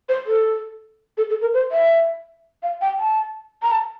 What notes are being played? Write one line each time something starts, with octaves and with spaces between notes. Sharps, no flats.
C5
A4
A4
A4
A#4
C5
E5
F5
G5
A5
A#5
A5